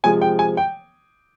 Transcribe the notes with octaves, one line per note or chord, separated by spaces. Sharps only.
C3 F3 G#3 G#5
G5
G#5
G5